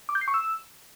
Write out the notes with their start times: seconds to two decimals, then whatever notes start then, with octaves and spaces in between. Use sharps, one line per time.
0.09 D6
0.15 G6
0.21 C7
0.28 C#6
0.34 E6